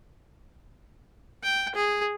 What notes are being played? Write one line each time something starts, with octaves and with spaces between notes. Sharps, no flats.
G5
G#4